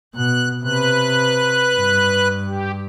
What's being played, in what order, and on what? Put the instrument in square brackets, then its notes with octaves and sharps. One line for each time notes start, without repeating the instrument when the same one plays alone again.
[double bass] B2 [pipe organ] F#6
[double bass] C3 [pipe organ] B4 F#6
[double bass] G2
[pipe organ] G4